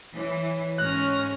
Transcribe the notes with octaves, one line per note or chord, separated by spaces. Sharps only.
E3 C#5
G#2 C#4 F6 F#6 A#6